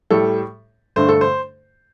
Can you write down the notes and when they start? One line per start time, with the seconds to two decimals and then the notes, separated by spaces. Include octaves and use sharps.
0.11 A2 G3 A4
0.96 G2 D3 A3 C5
1.09 A4
1.21 C5